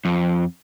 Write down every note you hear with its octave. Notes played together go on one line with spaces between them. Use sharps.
F2